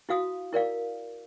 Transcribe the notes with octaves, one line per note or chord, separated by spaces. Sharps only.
E4 F#4 F5 D#6
E4 A#4 D5 F5